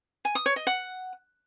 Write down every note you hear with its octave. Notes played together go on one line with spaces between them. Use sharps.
G#5
D#6
C#5
D#5
F#5